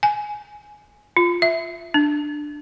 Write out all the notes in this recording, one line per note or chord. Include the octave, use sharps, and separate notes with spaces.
G#5
F4
E5
D4